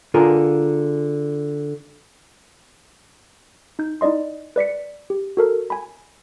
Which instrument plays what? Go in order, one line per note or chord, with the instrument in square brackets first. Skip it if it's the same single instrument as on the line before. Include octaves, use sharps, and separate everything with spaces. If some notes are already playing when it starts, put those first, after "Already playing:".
[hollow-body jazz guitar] D3 F4 G#4 A#4
[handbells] D#4 G6
D#4 E4 D5 D#5 C6
B4 D5 B6 C#7
G4
F#4 A4 A#4
G#5 B5